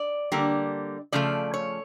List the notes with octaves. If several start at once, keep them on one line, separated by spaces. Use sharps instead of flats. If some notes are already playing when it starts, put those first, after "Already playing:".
Already playing: D5
D3 G3 A#3
C#3 F3 A3 D5
C#5